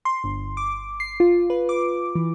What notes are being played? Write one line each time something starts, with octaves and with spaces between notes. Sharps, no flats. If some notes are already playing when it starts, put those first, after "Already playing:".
C6
G1
D6
C7
F4
B4
D6
E3